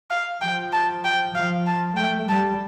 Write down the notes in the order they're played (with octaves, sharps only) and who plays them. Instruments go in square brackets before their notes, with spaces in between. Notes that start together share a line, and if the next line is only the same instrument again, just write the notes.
[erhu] F5
[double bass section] F3 [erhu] G5
[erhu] A5
G5
[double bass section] F3 [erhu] F5
[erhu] A5
[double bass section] A3 [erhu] G5
[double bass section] G3 [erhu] A5